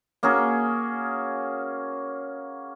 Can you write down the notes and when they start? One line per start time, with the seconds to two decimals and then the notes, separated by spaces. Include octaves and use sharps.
0.23 A#3 C#4 F#4 G#4